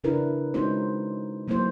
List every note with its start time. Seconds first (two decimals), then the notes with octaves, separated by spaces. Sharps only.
0.04 C#3 D4 E4 A#4 B4
0.54 G#3 C#4 D#4 F#4 C5
1.48 F#3 A#3 B3 E4 C5